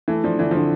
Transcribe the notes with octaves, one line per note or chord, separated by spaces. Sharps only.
E3 A3
F3 D4
D3 E3
D3 F3